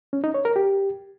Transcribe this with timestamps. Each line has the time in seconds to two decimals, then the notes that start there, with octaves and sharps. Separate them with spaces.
0.13 C#4
0.24 D#4
0.34 C#5
0.45 A#4
0.56 G4